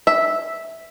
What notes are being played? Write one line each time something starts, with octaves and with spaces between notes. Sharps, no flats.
E5